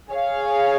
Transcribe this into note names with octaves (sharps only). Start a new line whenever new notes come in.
G#4 C#5 F5